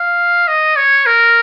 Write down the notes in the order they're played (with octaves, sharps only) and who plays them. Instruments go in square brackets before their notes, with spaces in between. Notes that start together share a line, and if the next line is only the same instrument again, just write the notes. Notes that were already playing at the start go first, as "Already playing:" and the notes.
Already playing: [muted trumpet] F5
D#5
C#5
A#4